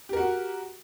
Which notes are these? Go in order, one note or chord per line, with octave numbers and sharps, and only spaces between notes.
F#4 G4 A#4